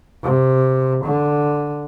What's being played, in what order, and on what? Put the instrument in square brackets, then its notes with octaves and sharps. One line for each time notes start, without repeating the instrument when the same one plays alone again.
[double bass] C3
D3